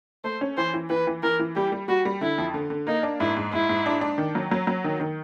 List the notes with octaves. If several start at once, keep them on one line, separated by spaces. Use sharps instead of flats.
A3 C5
C#4
E3 C5
E3
E3 B4
E3
E3 A#4
E3
G3 G4
G3
G3 F#4
G3
D3 E4
F2
D3
D3
A#3 D#4
D4
G#2 E4
G#2
G#2 E4
G#2
D4
D4
D#3
F#3
F#3
F#3
D#3
D#3